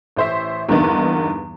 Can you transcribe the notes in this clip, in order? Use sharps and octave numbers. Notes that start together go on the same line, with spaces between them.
A1 C5 E5
E2 G2 D3 A#3 B3 D#4